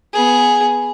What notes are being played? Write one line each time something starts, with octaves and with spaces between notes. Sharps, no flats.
B3 G#4